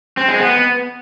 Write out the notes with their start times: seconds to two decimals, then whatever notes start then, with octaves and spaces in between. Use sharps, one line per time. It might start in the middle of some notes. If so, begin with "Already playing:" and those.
0.17 C4
0.28 G#3
0.39 B3